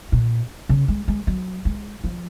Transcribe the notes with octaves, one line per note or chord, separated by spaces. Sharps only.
A#2
C#3
G#3
G#3
F#3
G#3
F3